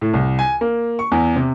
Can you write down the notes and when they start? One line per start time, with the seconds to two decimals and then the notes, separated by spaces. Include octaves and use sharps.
0.02 A2
0.13 C2
0.39 G#5
0.61 A#3
0.99 C#6
1.12 E2
1.36 C3